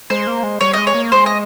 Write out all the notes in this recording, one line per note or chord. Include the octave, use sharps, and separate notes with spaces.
G#3 C5
A#3
G#3
G3 C#5
G#3 D#5
C#5
A#3
G#3 C5
D#5